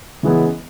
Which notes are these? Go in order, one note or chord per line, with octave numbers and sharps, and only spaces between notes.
C#3 E3 G#3 B3 E4